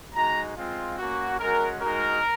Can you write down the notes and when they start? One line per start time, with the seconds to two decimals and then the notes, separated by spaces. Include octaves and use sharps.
0.14 G#3 D#4 F#4 A#5
0.56 G#3 C4 F4
0.98 A#3 C#4 F#4
1.40 G#3 C#4 F#4 A#4
1.81 G#3 D#4 F#4 A#4